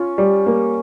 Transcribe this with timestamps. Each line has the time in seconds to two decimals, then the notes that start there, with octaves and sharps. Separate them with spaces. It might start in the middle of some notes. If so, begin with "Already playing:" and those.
Already playing: C#4 F4
0.18 G3
0.47 A#3